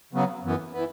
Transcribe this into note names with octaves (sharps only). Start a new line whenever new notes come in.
C#3 F#3 B3
F#2 E3 B3
E3 B3